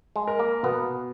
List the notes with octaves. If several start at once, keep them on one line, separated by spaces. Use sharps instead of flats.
G#3
A#4
A#3
B2 B3